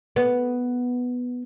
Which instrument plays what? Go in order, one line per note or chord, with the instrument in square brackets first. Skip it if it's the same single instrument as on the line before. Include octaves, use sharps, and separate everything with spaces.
[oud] B3